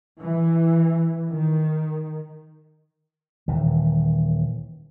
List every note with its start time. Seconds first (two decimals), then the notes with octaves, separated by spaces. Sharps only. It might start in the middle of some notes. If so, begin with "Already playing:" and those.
0.20 E3
1.29 D#3
3.48 D#1 D#3 E3